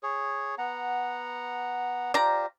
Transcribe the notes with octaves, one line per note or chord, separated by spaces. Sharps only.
G#4 C#5
B3 F#5 A#5
F4 G4 C5 D5 A#5